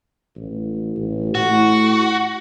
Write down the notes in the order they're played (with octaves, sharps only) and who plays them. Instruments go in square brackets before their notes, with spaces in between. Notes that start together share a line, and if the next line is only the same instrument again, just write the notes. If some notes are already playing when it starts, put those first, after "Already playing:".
[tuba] A1
A1
[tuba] A2 [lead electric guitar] F#4